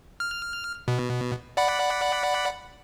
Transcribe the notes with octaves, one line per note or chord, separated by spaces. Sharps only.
F6
B2
D5 F#5 B5